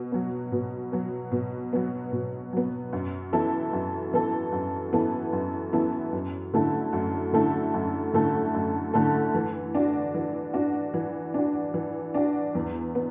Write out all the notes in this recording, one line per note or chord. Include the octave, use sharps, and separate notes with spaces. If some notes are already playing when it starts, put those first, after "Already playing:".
Already playing: B2
F#3 B3
B2
F#3 B3
B2
F#3 B3
B2
F#3 B3
F#2
E3 B3 E4 A4
F#2
E3 B3 E4 A4
F#2
E3 B3 E4 A4
F#2
E3 B3 E4 A4
F#2
D3 A3 E4 A4
F#2
D3 A3 E4 A4
F#2
D3 A3 E4 A4
F#2
D3 A3 E4 A4
E3
D4 F#4
E3
D4 F#4
E3
D4 F#4
E3
D4 F#4
E2
B3